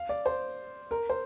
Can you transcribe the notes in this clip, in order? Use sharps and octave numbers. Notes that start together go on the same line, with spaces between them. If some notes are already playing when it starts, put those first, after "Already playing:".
Already playing: F5
D5
C5
A#4
C5